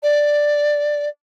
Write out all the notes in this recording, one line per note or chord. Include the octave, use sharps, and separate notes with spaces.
D5